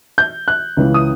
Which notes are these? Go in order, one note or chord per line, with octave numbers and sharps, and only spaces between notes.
G6
F#6
C#2 C#3 E3
D#6